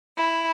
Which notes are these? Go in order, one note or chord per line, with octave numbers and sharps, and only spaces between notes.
E4